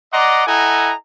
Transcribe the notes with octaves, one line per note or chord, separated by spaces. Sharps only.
D5 D#5 F#5 A#5 C6 D6
E4 A4 D#5 F#5 G#5 A#5